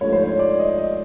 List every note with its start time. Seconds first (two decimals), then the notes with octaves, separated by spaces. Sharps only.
0.01 G#2 F3 A3 D4 C#5
0.12 C5
0.24 C#5
0.39 D5
0.59 D#5
0.69 D5
0.78 D#5